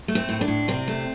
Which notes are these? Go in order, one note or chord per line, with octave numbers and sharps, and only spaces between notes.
A3
C4
A2
D4
A2
C3 C4
A3